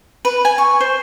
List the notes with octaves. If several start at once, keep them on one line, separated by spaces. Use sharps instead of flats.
B4
G#5
C#6
C5